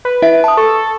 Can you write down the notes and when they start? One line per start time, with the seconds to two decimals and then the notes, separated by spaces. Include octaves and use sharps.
0.05 B4
0.22 E4 E5
0.44 A5 D#6
0.57 A4 C#6